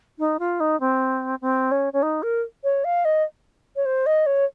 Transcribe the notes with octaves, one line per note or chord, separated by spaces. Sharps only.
D#4
F4
D#4
C4
C4
C#4
C#4
D#4
A#4
C#5
F5
D#5
C#5
C5
D#5
C#5